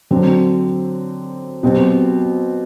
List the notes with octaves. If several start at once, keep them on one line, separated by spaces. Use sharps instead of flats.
D3 F#3 C4
B2 F#3 C4 G4